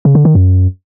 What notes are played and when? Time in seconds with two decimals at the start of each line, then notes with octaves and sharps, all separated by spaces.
0.05 C#3
0.15 D3
0.25 D#3
0.35 F#2